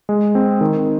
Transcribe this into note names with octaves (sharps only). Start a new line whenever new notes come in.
G#3
C4
D#3